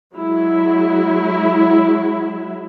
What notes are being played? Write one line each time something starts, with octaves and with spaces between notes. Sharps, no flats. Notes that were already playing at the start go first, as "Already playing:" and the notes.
F#3 G#3 E4